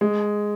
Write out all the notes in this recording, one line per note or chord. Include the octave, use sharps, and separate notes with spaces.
G#3